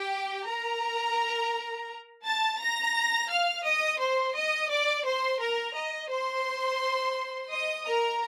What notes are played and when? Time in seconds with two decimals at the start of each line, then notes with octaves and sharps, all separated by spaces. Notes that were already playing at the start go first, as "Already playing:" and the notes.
Already playing: G4 G5
0.48 A#4 A#5
2.24 A5 A6
2.59 A#5 A#6
3.29 F5 F6
3.64 D#5 D#6
3.99 C5 C6
4.34 D#5 D#6
4.70 D5 D6
5.05 C5 C6
5.40 A#4 A#5
5.75 D#5
6.10 C5 C6
7.51 D#5 D#6
7.86 A#4 A#5